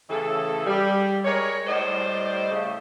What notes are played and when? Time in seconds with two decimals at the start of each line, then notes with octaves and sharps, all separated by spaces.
0.10 A2 C#3 E3 A4
0.67 G3
1.25 G#3 A#4 C#5
1.67 A2 G3 C5 D5 D#5
2.51 C#3 A3